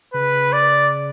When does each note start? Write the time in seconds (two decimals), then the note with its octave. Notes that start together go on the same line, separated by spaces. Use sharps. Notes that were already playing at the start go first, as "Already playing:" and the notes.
0.14 C#3 B4
0.53 D5